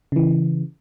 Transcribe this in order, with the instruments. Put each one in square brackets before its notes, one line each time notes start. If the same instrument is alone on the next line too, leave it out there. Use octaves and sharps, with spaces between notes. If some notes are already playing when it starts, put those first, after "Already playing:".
[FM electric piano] C#3 E3